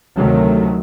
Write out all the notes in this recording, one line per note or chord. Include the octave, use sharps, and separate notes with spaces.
D2 C3 D#3 F#3 A3